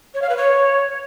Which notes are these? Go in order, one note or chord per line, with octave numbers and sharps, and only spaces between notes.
C#5
F5
B4
C#5